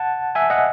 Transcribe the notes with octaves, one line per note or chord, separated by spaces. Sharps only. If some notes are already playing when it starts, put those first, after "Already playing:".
Already playing: F#5 A5
E5 G#5
D#5 F#5